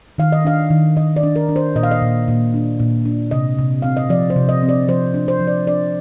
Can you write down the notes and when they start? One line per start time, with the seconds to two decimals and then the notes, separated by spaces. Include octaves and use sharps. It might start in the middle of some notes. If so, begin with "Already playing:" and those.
0.18 D#3 F5
0.32 D#5
0.45 D4 F5
0.71 D#3
0.97 D#3 D#5
1.16 D5
1.23 D4
1.36 A#4
1.49 D4
1.56 C5
1.75 A#2 D#5
1.83 F5
1.91 D#5
2.02 A#2
2.28 A#2
2.54 D4
2.80 A#2
3.05 D4
3.31 C3 D#5
3.59 C3
3.82 C4 F5
3.97 D#5
4.10 F3 D5
4.30 C5
4.36 C3
4.49 D#5
4.63 C4
4.69 D5
4.88 F3 C5
5.14 D4
5.28 C5
5.40 F3
5.47 D5
5.67 D4 D5